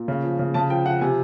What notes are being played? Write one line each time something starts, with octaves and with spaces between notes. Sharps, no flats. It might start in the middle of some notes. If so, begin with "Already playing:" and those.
Already playing: A#2
C#3
F3
C#3
C#3 A5
F3 G5
F3 F#5
C3 G#5